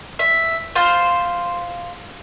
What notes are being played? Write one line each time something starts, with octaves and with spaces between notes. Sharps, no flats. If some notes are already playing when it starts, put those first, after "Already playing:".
E5
F4 C5